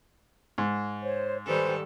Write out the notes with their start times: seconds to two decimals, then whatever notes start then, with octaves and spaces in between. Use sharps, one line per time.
0.58 G#2
1.02 C5 C#5
1.46 D#3 G3 A4 B4 C5 G#5